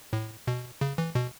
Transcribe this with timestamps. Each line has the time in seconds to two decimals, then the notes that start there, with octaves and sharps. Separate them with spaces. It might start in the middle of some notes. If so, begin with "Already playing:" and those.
0.13 A2
0.47 B2
0.81 C#3
0.98 E3
1.15 B2